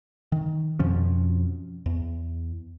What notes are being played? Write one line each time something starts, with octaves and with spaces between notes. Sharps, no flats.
D#3
F2 B2 F3 C#4
E2